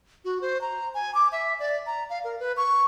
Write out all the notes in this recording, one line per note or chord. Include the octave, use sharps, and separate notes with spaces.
F#4
C5
A#5
G#5
D6
E5
D5
A#5
F5
A#4
B4
C#6